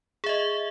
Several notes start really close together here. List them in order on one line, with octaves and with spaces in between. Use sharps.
G#4 E5 D#5